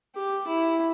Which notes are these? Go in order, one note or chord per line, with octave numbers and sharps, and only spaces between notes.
G4
E4